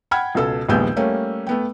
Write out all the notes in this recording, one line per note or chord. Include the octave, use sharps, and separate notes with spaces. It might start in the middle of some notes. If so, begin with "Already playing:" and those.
F#5 G5 B5 F6 G#6
C#2 B2 A4 E6
A#1 D#2 G#3 B3 E6 G6
G3 A3 A#3 C#4
A3 B3 G5